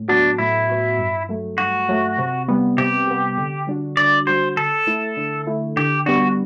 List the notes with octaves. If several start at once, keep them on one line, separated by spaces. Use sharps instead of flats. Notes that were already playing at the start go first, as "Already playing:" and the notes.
Already playing: A2
F#3 B3 D4 F#4
A2 E4
F#3 B3 F#4
G2
F#3 A3
G2 F#4
F#3 A3
C3
G3 B3
C3 G4
G3 B3
D3
G3 D4 F#4
D3 D5
G3 D4 F#4 C5
D3 A4
A3 E4
D3
A3 E4
D3 G4
G3 B3 D4 F#4